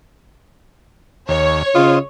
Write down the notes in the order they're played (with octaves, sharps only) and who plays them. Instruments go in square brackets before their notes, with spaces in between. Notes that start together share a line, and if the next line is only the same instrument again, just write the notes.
[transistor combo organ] D#2 [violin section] C#5
[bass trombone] C#3 [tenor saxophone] F4 [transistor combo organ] C5 D#5